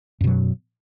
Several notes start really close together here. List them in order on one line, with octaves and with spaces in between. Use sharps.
F#2 B2 F#3